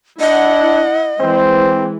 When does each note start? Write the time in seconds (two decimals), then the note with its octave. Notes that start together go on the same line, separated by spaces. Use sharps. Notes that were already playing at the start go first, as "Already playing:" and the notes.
0.20 D4 E4 D#5 F#5
1.20 E3 G#3 C4 C5